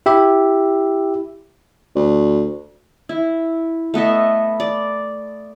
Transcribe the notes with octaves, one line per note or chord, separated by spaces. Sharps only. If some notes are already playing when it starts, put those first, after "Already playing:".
E4 G4 E5
D2
E4
A3 B3 D#5 E5
D5